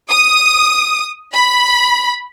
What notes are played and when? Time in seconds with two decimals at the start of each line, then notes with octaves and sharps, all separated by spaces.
0.10 D#6
1.34 B5